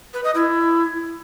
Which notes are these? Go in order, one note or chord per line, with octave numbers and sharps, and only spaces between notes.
B4
D#5
E4